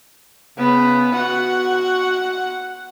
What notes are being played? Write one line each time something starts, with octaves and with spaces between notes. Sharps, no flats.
C#3 B3
F#4 F#5